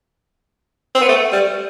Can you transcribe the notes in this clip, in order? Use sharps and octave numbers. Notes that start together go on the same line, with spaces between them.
C4
B3
A3
G3